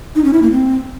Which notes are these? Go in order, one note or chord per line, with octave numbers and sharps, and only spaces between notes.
D#4
C#4
E4
A#3
C4